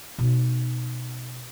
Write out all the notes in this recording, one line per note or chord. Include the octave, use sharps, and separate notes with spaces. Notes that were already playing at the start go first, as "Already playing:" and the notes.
B2 D#4